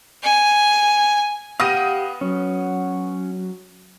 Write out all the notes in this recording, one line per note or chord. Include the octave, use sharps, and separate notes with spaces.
G#5
B3 G4 F5 G5 D#6 A#6 D#7
F#3 C#4